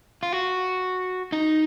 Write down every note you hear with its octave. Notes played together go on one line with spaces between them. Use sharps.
F4
F#4
D#4